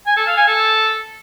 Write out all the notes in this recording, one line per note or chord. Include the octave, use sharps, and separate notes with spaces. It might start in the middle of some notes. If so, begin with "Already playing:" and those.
G#5
A4
F5
G#5
A4